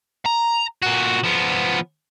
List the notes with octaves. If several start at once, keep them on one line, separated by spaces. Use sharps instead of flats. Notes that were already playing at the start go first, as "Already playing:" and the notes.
A#5
A#2 F#4
F3 B3